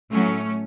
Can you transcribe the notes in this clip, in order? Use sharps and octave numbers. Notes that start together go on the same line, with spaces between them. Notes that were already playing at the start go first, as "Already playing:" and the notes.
A2 F#3 A3 C#4